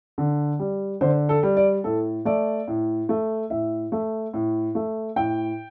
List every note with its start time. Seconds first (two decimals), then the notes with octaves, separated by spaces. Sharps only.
0.18 D3
0.59 G3
1.01 D3 C5
1.29 A4
1.43 G3
1.57 D5
1.84 A2 A4
2.25 A3 D5
2.68 A2
3.09 A3
3.50 A2 E5
3.92 A3
4.34 A2
4.75 A3
5.16 A2 G5